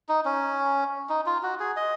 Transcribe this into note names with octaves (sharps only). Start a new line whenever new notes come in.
D#4
C#4
D#4
F4
F#4
G#4
D#5